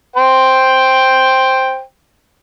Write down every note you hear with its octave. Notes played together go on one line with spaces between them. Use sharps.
C5 G5